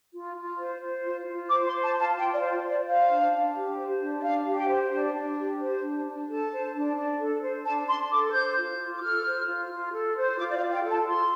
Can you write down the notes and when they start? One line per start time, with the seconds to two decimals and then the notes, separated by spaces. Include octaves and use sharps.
0.13 F4
0.36 F4
0.58 C5
0.81 C5
1.04 F4
1.26 F4
1.49 C5 D6
1.67 C6
1.72 C5
1.84 A5
1.95 F4
2.00 A5
2.18 F4 G5
2.35 D5
2.40 C5
2.63 C5
2.69 D5
2.86 C5 F5
3.09 D4
3.32 D4
3.54 G4
3.77 C5
4.00 D4
4.18 D5
4.23 D4 F5
4.46 G4
4.57 G5
4.69 C5
4.92 D4
5.14 D4
5.37 G4
5.60 C5
5.82 D4
6.05 D4
6.28 A4 A5
6.51 C5
6.74 D4
6.96 D4
7.19 A4
7.42 C5
7.65 D4 A5
7.87 D4 C6
8.10 A4 D6
8.33 C5 G6
8.56 F4
8.78 F4
8.97 D6
9.02 A4 F6
9.24 C5
9.47 F4
9.70 F4
9.93 A4
10.15 C5
10.38 F4 D6
10.49 D5
10.56 F5
10.61 F4
10.72 G5
10.83 A4
10.90 A5
11.07 F4 C6